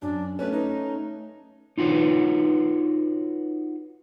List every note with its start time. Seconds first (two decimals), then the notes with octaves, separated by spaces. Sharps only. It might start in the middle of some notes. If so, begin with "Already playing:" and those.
0.02 F#2 D4
0.39 A3 C#4 B4
0.52 D#4
1.78 D#4 F4 F#4 B4 C#5